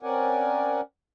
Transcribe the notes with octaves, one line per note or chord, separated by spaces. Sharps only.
C4 C#4 A#4 D5 F#5 G#5